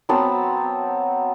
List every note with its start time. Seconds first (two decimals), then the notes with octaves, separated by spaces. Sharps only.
0.09 F#3 B3 C4 A5